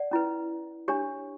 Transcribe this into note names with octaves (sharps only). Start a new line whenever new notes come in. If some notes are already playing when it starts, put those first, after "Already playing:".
Already playing: D5 F#5
C#4 E4 B4
D4 G4 C#5